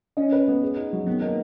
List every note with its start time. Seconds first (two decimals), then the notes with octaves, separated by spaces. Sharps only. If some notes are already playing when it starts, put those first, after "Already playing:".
0.17 C#4 D#5
0.32 B4
0.48 B3
0.63 G#4
0.77 D#4
0.93 F#3
1.07 D#3 B3
1.21 A#3 D#4